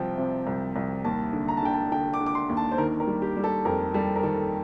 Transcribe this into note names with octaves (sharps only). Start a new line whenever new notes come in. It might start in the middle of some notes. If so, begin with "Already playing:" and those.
Already playing: C2 C3 F3 G5
C3
C2
C2
D#2 A5
D3
A#5
A5
D3 G5
A5
D3 G5
D6
D3
D6
C6
D#2
A5
C5
D#3 A#4
A#4
G3
G4
G3
A4
F2 A#4
G3 A4
A#4
D#3 A4